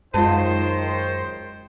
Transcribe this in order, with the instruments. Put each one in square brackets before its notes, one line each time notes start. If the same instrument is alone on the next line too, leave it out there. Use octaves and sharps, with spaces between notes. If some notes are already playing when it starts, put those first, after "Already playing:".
[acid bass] F#2 [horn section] D#3 C5 [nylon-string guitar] G#3 F4 [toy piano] A5